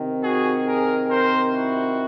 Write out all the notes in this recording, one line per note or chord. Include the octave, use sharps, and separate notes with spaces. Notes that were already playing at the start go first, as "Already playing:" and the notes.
Already playing: C3 D#3
F#4 G#4
G#4 A#4
A#4 C5
E4 F#4